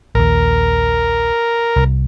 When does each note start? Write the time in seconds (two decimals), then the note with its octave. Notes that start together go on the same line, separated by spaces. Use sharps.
0.15 A#1 D#2 A#4
1.76 C2